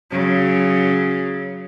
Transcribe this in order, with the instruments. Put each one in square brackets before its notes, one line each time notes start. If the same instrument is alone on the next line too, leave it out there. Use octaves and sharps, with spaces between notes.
[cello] C#3 F#3